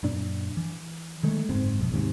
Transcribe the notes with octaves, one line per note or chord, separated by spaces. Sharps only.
F#2 A#2 D4
E3
D#3 G#3 A3
F#1 G#2 C4
B1 F2
D#2 G#2 C3